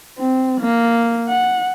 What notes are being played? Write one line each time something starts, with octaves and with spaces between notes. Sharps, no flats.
C4
A#3
F#5